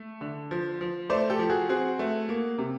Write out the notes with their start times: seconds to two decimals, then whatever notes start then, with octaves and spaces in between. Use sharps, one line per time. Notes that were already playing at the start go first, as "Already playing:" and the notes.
Already playing: A3
0.21 D3
0.51 F3
0.81 F3
1.09 A3 C5 D5
1.30 G4 A4
1.39 F3
1.49 F#4 G#4
1.69 C4 F#4 G#4
1.99 A3
2.29 A#3
2.58 C3